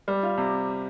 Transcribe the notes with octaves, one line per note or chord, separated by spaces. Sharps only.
G3
F4
C3